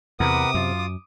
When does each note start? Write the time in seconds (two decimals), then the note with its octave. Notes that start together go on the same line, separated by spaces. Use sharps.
0.20 E2 C3 A#4 B4 F#5 D6 D#6
0.54 F#2 F4